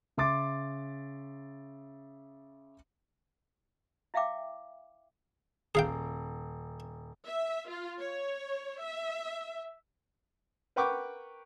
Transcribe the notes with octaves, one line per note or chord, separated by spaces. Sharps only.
C#3 E5 C6 D6 A6
E4 E5 F5 G5 D6
D#1 G#4 F5 G5
E5
F4
C#5
E5
A#4 B4 F#5 G5 C#6 D6